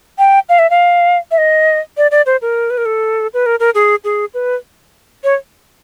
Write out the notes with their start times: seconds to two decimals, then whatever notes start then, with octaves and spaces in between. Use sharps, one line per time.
0.19 G5
0.49 F5
0.59 E5
0.70 F5
1.31 E5
1.38 D#5
1.97 D5
2.11 D5
2.26 C5
2.42 A#4
2.70 B4
2.78 A#4
2.85 A4
3.34 B4
3.46 A#4
3.60 A#4
3.75 G#4
4.04 G#4
4.34 B4
5.24 C#5